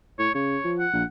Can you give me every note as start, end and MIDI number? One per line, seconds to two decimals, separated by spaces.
0.19 0.29 45
0.19 0.33 73
0.35 0.58 49
0.35 0.73 73
0.64 0.86 53
0.79 1.04 78
0.93 1.04 34